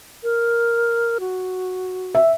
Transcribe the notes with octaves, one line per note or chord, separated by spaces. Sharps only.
A#4
F#4
E5